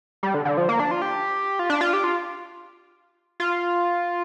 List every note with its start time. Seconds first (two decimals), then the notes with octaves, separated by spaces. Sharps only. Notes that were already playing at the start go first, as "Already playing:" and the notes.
0.23 G3
0.34 D3
0.45 D3
0.57 F3
0.69 A#3
0.80 D4
0.91 F4
1.02 G4
1.59 F4
1.70 D4
1.81 F4
1.93 G4
2.04 F4
3.40 F4